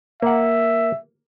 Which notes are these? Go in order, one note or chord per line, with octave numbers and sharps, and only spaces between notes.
A#3 E5 F#5